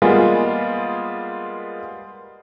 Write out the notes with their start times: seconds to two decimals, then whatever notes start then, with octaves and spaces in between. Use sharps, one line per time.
0.02 G3 G#3 A#3 B3 F4 G#4